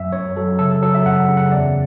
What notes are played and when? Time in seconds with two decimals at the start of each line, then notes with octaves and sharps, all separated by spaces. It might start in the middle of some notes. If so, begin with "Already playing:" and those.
Already playing: F#2 F#3 E5
0.12 F#2 C#5
0.36 F#3 A4
0.59 C#3 A4
0.71 A4
0.82 F#3 A4
0.94 E5
1.05 F#2 F#5
1.29 C#3
1.37 F#5
1.52 E2 D5